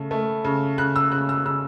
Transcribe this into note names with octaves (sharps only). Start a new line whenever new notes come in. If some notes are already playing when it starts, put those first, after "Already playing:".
Already playing: C#3 A3
A3
C#3
C#3 F#6
E6
C#3 F#6
E6
C#3 E6